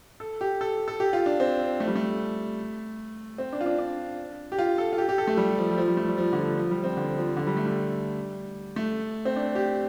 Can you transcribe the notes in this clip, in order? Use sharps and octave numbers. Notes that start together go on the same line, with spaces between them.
A4
G4
A4
A4
G4
F4
D4
C4
A3
G3
A3
C4
D4
F4
D4
D4
G4
F4
A4
F4
G4
G4
A4
A3
G3
F3
G3
F3
G3
A3
G3
F3
D3
F3
F3
G3
C4
D3
F3
D3
G3
A3
G3
A3
C4
D4
G4